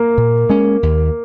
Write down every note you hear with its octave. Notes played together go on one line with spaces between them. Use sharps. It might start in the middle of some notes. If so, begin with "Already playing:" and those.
Already playing: A#3
A#2
G#3 C#4
D#2